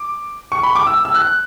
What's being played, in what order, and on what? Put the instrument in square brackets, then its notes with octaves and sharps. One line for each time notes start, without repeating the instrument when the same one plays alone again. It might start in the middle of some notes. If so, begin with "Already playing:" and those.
Already playing: [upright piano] D6
C#6
B5
D6
E6
E6
F#6